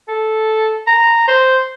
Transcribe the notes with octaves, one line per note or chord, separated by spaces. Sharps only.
A4
A#5
C5